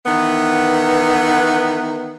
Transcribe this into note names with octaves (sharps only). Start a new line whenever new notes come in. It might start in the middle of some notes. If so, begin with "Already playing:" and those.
D#3 E3 B3